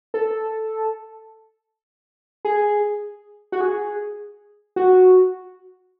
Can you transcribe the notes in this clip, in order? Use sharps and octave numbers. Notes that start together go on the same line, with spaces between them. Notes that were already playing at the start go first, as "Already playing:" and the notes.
A4
G#4
F#4
G#4
F#4